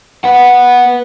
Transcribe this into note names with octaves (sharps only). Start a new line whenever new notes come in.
B4 F#5